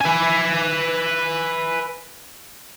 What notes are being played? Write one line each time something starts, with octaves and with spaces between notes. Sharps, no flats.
B4 G#5